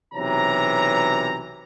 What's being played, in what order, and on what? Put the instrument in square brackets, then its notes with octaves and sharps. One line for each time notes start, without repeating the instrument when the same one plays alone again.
[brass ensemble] B1 C3 E3 C#5 A#5